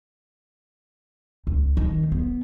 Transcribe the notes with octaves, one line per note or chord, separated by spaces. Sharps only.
C#2
D#3
B3